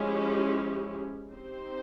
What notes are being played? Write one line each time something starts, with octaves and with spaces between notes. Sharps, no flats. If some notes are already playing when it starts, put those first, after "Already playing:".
Already playing: F3 G#3 C#4 E4 G4
C4 D#4 G4 C5